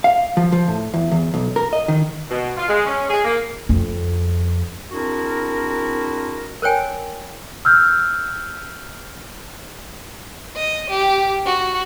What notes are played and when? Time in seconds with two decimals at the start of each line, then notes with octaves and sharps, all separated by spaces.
0.04 F5
0.37 F3
0.52 F3
0.68 A2
0.94 E2
1.11 E2
1.34 B1
1.56 A#4
1.73 D#5
1.88 D#3
2.30 B2
2.57 F4
2.69 G#3
2.86 C#4
3.09 G#4
3.24 A#3
3.69 F2
4.91 C4 D4 E4 F#4 G#4 A#4
6.62 A#4 C5 C#5 G5 G#5
7.65 E6 F6 G6
10.57 D#5
10.90 G4
11.46 F#4